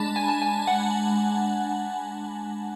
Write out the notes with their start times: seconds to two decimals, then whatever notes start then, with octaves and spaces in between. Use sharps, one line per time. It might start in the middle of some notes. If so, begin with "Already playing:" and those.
Already playing: G#3 D4 A5 B5
0.16 G#5
0.28 A5
0.42 G#5
0.67 F#5